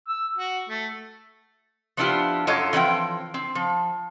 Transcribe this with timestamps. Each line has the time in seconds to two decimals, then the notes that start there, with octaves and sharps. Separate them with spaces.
0.08 E6
0.37 F#4
0.69 A3
1.97 F3 B3 D4 E4 F4 G4
2.47 F#2 F#3 F4 A4 C#5 D#5
2.73 E3 F3 C4 D#5 G5
3.34 C4
3.55 F3